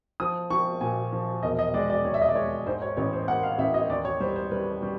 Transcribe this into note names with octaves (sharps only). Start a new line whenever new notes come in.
F3 D#6
F3 C#6
A#2 G#5
F3
E1 D#5
D#5
G#3 D5
D5
D#2 C#5
E5
D#5
D5
G#3 C#5
G#2 C5
C#5
A1 C#5
C5
A#3 F#5
F5
A1 E5
D#5
D#2 D5
C#5
G3 C5
C5
G3 B4
G3